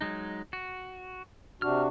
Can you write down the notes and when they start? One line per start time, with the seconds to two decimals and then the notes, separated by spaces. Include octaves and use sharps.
0.01 F#3 G#3 D#4
0.53 F#4
1.62 C3 D4 F#4 F6